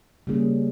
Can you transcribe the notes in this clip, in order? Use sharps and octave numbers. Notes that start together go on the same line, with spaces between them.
C#3 G3 A#3 C#4 G#4